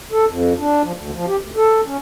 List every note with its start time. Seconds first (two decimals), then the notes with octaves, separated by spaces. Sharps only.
0.12 A4
0.28 F2
0.59 D4
0.84 F3
0.96 D2
1.15 F3
1.28 G4
1.41 D2
1.56 A4
1.86 C#4